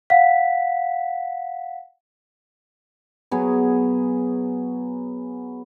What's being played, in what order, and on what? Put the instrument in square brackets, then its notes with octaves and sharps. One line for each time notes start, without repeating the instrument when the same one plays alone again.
[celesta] F5 F#5 B6
[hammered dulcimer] F#3 B3 G#4